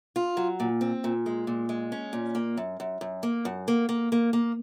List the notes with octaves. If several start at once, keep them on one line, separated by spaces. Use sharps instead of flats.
F4
F#3
A#2
C4
A#2
G#3
A#2
G#3
C#4
A#2
A#3
F#2
F#2
F#2
A#3
F#2
A#3
A#3
A#3
A#3